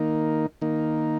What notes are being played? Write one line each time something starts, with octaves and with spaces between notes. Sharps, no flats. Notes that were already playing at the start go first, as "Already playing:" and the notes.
Already playing: D#3 A#3 D#4
D#3 A#3 D#4